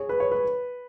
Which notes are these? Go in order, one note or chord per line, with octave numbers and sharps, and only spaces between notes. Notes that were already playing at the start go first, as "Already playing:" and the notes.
Already playing: G#4 C#5
B4
C#5
B4